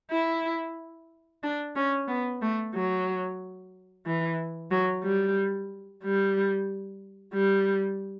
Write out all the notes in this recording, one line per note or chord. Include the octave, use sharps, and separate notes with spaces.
E4
D4
C#4
B3
A3
F#3
E3
F#3
G3
G3
G3